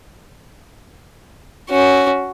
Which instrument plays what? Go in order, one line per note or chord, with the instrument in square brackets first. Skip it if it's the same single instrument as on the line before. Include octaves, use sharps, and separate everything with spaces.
[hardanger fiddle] C#4 F#4